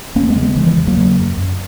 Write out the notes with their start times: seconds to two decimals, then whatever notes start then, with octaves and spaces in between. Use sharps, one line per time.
0.15 E2 A#3 C#4
0.29 G#3 B3
0.36 C#3
0.42 G#3 B3
0.56 C#3 E3 G#3
0.66 E3
0.77 E2
0.87 F#3 A#3
0.97 C#3
1.17 F#2
1.38 F#2